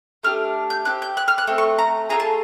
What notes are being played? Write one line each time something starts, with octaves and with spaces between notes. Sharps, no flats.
A3 D4 G4 F6
G6
C4 D#4 G4 F#6
G6
F#6
F6
F#6
A3 C4
C#6
A#5
A3 C4 F4 G#4 A#5
A5